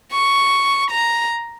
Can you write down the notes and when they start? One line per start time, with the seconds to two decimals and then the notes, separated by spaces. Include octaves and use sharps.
0.12 C#6
0.91 A#5